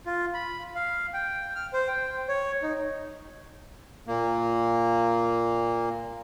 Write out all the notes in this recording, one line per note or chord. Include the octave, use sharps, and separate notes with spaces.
F4
B5
F5
G5
F6
C5
G5
C#5
D#4
A#2 A#3